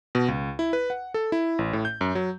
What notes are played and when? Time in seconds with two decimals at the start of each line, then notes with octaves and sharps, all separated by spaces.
0.15 B2
0.28 C#2
0.59 E4
0.73 B4
0.90 F#5
1.14 A4
1.32 E4
1.59 A1
1.73 A2
1.85 G6
2.01 F#2
2.15 F#3